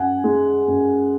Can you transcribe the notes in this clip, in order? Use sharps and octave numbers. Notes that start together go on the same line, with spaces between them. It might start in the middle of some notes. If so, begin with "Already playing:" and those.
Already playing: F#2 F#5 G#5
G#3
F#2